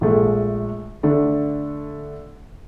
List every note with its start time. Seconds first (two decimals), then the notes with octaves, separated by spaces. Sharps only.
0.01 A#1 G#3 A3
1.03 D3 A3 D4